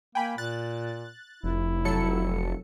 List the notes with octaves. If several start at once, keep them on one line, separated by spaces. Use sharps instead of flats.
A#3 G5 G#5 B5
A#2 F#6 A6
F1 E4
F#3 A4 C#7